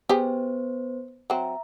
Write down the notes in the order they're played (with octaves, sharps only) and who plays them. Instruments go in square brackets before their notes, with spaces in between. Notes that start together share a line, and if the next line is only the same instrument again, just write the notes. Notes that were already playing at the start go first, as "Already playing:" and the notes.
[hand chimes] B3 B4 C5 [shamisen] G4 G#4
[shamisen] F#3 C4 [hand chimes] E5 A#5